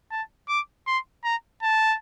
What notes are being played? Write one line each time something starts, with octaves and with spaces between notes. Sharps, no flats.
A5
D6
C6
A#5
A5